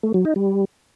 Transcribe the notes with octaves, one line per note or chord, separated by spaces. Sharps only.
A3
F#3
D#4
G3